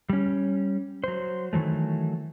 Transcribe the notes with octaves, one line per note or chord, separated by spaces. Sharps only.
G3 C#4
F#3 C5
D#3 E3 F#3 A3